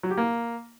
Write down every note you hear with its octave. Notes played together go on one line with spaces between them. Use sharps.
F#3
G4
A#3